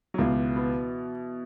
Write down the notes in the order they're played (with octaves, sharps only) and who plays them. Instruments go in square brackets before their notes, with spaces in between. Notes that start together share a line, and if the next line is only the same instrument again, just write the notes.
[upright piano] F#3
[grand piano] C#2 [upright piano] B2 E3
[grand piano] B3